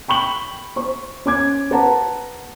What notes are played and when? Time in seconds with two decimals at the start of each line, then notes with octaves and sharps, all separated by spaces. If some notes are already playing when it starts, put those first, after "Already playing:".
0.08 G5 B5 C#6 F#7
0.76 C5 C#6
1.26 C#4 D6 G#6
1.71 B4 F#5 A5 A#5